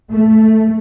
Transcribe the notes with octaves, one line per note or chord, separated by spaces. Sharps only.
A3